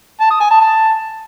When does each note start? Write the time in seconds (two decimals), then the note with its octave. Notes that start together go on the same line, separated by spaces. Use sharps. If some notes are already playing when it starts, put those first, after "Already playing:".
0.20 A5
0.31 D#6
0.41 G#5
0.51 A5
0.61 A5